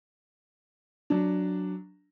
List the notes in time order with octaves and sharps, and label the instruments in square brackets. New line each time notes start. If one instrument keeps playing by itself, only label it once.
[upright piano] F#3 D4